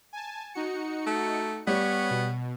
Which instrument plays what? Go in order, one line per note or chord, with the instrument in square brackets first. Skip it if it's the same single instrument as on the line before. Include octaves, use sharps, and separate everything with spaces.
[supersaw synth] G#5 A5
D#4 F#4 C#7
[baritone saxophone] A3
[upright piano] G3 [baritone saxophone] B3 [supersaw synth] C#5 C#6
[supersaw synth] B2